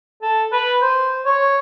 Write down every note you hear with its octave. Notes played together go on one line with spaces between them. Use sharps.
A4
B4
C5
C#5